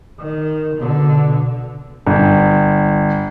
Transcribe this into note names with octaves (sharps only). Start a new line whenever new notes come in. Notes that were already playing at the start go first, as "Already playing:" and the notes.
D#3
B2 D3
G1